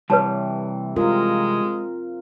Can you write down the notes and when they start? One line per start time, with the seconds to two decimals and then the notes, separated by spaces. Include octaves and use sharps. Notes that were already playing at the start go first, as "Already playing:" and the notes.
0.10 C3 E3 G3 B4 C#5 A5
0.96 G#3 C4 F4 A#4